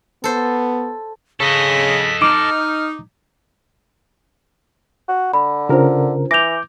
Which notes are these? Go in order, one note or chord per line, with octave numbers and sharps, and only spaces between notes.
B3 A4 C5
C#3 A4 D#5 B6
D#4 D6 F6
F#4
D3 B5
C#3 D4 F4 A#4 C5
E3 D6 G6 A#6 F7